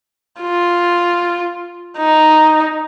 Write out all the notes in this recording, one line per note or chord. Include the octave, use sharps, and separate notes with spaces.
F4
D#4